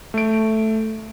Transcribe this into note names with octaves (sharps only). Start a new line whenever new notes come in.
A3 D7